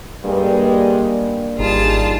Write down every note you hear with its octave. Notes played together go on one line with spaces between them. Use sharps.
G2 G3 G#3 A#3
G#1 G3 D#4 F4 G#4 A5